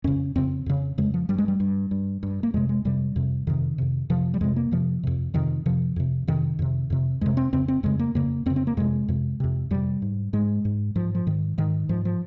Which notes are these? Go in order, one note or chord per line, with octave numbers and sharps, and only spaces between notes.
F2 C#3 C#4
F2 C#3 C4
F2 C#3
F2 C#3 G#3
F3
G2 G3
G#3
G3
G2
G2
G2
A#3
F2 C3 G#3
G#3
F2 C3 G3
F2 C3
F2 C3 D#3
F2 C3
F2 C3 F3
G3
F2 C3 G#3
A#3
F2 C3 F3
F2 C3
F2 C3 D#3
F2 C3 F3
F2 C3
F2 C3 D#3
F2 C3
F2 C3
F2 C3 G#3
C4
F2 C#3 C4
C4
F2 C#3 G#3
A#3
F2 C#3 A#3
F2 C#3 C4
C4
A#3
F2 C3 G#3
F2 C3
F2 C3
F2 C3 G3
G#2
G#2 G#3
G#2
G#2 F3
F3
G#2 D#3
G#2 D#3
G#2 F3
F3